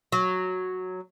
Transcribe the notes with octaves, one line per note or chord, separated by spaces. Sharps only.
F#3